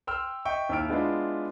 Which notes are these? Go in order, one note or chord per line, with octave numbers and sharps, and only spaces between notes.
G5 C6 E6 F6
D#5 E5 G5 C#6
D#2 E4 E5 E6 F6 D7
G#3 B3 D4 E4 F4